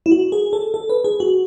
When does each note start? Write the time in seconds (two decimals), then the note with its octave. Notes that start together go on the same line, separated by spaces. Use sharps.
0.06 E4
0.11 F#4
0.32 G#4
0.53 A4
0.74 A4
0.90 B4
1.04 G#4
1.20 F#4